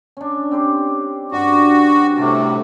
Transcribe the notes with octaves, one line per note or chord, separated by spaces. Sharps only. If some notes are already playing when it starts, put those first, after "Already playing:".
C#4 D4
C4 G4 C5
G2 D4 F#4 D6
A2 C3 F5 A5 D6